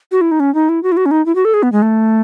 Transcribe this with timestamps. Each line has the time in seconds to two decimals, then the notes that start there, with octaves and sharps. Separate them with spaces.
0.12 F#4
0.21 E4
0.31 D#4
0.40 C#4
0.55 D#4
0.69 E4
0.83 F#4
0.92 E4
0.97 F#4
1.06 C#4
1.11 D#4
1.26 E4
1.35 F#4
1.45 A4
1.54 G#4
1.63 B3
1.72 G#3
1.82 A3